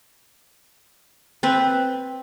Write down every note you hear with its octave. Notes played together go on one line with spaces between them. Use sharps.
C4 B4